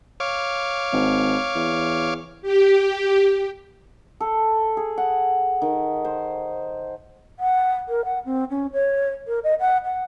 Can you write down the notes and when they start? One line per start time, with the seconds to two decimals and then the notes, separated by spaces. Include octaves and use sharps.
0.20 C#5 F5 D6
0.93 G#1
1.55 E2
2.42 G4
4.20 A4
4.77 G#4
4.98 F#5
5.62 D#3
6.05 C5
7.39 F#5
7.89 A#4
8.05 F#5
8.25 C4
8.50 C#4
8.73 C#5
9.27 A#4
9.44 D#5
9.60 F#5
9.85 F#5